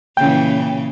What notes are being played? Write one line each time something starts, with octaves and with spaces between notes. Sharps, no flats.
A#2 C#3 E3 G5